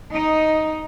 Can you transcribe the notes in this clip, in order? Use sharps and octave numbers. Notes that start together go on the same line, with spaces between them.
D#4